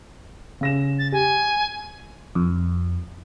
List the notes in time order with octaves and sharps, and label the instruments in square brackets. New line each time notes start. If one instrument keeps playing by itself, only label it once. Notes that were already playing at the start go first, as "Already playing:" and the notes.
[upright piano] C#3 A#6 E7
[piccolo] A6
[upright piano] G4 [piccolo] G#5
[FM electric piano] F2